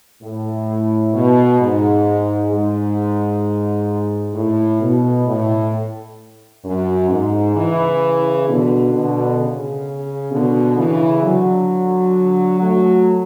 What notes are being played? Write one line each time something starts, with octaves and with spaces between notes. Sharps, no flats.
A2
B2
G#2
G#2
A2
B2
A2
F#2
G#2
C#3 E3
B2 D3
B2 D3
C#3
B2 D3
C#3 E3
D3 F#3
F#3 A3